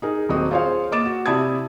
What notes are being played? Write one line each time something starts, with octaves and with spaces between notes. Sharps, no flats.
D#4 G#4 A#4
D#1 F#3 C4 D#5 D#6
F4 G#4 C5 C#5 F5
A#3 D#5 D6 A6 E7
F#4
C3 E4 D5 A5 D#6 G#6